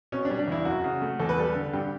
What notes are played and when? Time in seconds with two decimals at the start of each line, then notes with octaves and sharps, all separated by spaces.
0.12 B2 C#4
0.25 G3 D4
0.39 D4
0.48 E2 E4
0.65 F#2 F#4
0.84 C#3
1.02 A3
1.20 E2 A4
1.29 B4
1.38 G3 A4
1.55 D3
1.73 G2 G4